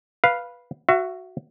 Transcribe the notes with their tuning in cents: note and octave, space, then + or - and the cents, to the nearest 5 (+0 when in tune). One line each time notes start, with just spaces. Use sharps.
B4 -10 F5 +0
F#4 +0 E5 +35